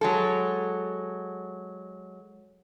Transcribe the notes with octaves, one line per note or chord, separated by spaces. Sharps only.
F#3 G#3 A4